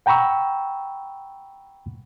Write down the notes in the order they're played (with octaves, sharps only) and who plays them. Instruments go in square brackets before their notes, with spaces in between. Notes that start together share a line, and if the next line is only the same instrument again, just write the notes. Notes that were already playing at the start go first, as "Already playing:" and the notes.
[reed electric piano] F#5 G5 A#5 B5 C#6 E6